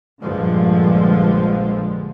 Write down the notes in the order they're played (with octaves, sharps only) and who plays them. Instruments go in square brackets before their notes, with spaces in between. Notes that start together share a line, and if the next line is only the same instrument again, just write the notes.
[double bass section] A#1 G2 D3 F3 G#3